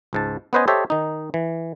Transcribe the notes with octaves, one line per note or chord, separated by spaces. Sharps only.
C#2 G#2 A5
B3 C#4 B4 C5 D#5 G#5
G4 A4 C5 C#5 D#5 E5
D#3 D#4
E3